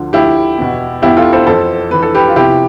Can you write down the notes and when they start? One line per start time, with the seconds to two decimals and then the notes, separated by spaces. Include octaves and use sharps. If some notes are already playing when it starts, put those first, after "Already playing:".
Already playing: D2 D3 F3
0.13 D2 D3 F3 E4 G4
0.58 E2 B2
1.02 E2 B2 E4 G4
1.17 F4 A4
1.33 A4 C5
1.47 F2 E3 A4 C5
1.91 F2 E3 B4
2.03 A4
2.15 G4 B4
2.28 F4
2.36 E2 C3 F3 E4 G4